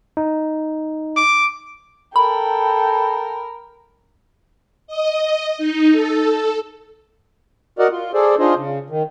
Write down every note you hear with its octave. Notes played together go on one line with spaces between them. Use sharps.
D#4
D6
A4 A#4 G5 B5
D#5
D#4
A4
F#4 A#4 D5 D#5 F#5
F4
G#4 A4 C5 D5
D4 D#4 F4 G#4 C5 D#5
C#3
D#3